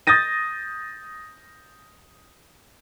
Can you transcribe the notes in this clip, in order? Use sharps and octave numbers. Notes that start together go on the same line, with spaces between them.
D#6 G6 A6 A#6 D#7